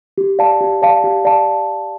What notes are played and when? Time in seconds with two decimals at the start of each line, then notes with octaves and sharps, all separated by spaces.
0.18 G4
0.39 D5 F5 A5
0.61 G4
0.82 D5 F5 A5
1.04 G4
1.25 D5 F5 A5